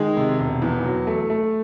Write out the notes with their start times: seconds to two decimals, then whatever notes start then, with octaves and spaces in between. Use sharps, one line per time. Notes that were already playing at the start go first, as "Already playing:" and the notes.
Already playing: D#3 G#3 G#4
0.17 C3
0.40 E1
0.62 E2
0.84 F#3
1.07 A3
1.30 A3